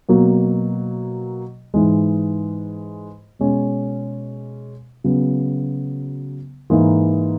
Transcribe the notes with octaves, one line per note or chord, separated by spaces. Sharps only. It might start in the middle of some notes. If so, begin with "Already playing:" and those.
B2 F#3 A#3
G#2 E3 G#3
B2 G#3 C#4
C#3 F#3 B3
G#2 E3 A#3